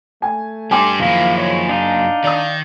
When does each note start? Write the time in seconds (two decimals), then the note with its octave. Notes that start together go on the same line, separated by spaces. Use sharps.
0.22 A3 G#5
0.71 G3 D4 G#5 C6 D6
1.00 F#2 D#3 F3 A#3 E4 F5
1.37 C#5
1.69 D4 D#4 F5
2.24 D#3 D5 D#6